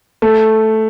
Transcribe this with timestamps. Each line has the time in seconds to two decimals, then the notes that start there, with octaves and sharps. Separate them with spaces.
0.22 A3